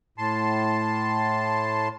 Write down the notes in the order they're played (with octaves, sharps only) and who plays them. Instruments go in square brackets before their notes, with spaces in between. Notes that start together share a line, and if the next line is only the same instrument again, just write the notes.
[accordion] A2 A5 C6